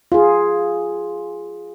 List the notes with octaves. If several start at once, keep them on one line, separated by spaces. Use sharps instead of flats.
F4 G#4